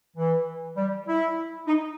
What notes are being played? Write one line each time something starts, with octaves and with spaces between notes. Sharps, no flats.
E3
G3
E4
D#4